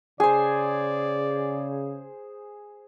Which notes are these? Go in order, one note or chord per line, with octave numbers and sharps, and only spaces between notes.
C#3 G#4 C5 D5 G#5